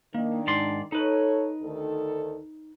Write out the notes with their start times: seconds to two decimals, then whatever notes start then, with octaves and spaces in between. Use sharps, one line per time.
0.14 D#3 A#3 D4
0.47 G#2 D5 C6
0.92 D#4 A4 B4 C#5
1.62 D2 D#3 A4